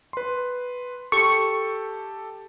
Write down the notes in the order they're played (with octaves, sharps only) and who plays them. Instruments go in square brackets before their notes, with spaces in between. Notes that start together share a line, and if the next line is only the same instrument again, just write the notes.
[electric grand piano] B4 C6
[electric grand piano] G4 A4 [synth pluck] C#6